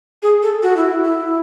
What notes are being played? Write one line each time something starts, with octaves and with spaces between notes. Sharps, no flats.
G#4
A4
F#4
E4
E4